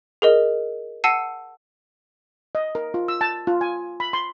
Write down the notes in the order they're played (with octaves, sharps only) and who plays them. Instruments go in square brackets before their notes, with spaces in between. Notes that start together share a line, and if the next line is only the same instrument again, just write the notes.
[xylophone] G#4 A#4 D#5
F#5 A5 E6 C7 C#7 D#7
[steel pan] D#5
A#4
F4
E6
A5
F4
G#5
B5
C6